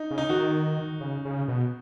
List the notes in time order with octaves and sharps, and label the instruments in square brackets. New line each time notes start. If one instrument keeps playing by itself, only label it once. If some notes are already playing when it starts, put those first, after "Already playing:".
Already playing: [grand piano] D#4
[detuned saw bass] C#3
[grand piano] D#4
[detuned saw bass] D#3 [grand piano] F#4
[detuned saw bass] C#3
C#3
B2